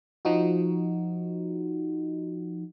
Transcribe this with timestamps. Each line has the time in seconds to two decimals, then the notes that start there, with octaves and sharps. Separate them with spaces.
0.25 F3 D#4 F#4